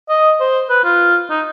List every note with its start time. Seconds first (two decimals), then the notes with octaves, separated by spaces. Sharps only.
0.09 D#5
0.40 C5
0.70 B4
0.84 F4
1.30 D#4